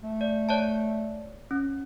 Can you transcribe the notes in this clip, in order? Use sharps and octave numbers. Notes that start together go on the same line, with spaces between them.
A3
D5
C#5 D5 A5
C#4